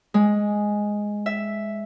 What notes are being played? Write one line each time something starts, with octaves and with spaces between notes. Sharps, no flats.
G#3
E5